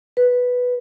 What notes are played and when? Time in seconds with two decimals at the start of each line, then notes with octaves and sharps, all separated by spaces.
0.17 B4